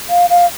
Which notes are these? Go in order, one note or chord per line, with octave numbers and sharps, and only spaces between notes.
F5
F5